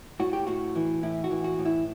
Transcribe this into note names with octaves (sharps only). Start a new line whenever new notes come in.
A2 F#4
G4
A2 F#4
E3
A2 E4
F#4
E3
F#4
A2
E4